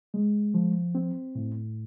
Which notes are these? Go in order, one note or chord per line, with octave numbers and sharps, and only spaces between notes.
G#3
F3
C4
A2